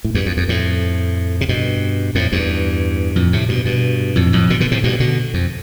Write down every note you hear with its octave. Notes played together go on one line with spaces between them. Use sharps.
A2
E2 G2
F2
F2
F2 A2
C3
G2 B2
F2 A2
E2 G2
F2 A2
A2 C3
G2 B2
G2 B2
F2 A2
F2 A2
B2 D3
B2 D3
A2 C3
G2 B2
B2 D3
F2